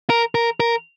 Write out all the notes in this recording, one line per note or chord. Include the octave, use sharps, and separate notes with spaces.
A#4
A#4
A#4